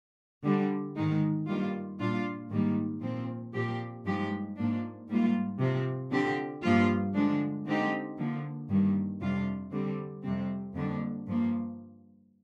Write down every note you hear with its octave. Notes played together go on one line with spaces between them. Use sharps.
D3 G3 D4
G#2 D#3 G#3 D#4
G2 D#3 G3 A#3 F4
A#2 G3 D4 F4
G#2 D#3 G3 A#3 D#4
A#2 F3 C4
A#2 F3 C4 G4
G2 F3 G#3 D#4 G4
G#2 F3 A#3 D4
G#2 G3 A#3 F4
C3 F3 C4
D3 F3 C4 G4
G2 F3 A#3 F4
D3 F3 G#3 D4
D3 G#3 C4 D#4 G4
D3 F3 A#3
G2 D#3 G3 A#3
F2 C3 G3 D4 F4
D3 G3 C4
F2 C3 G3 C4
F2 D3 G3 A#3 D4
G2 F3 A#3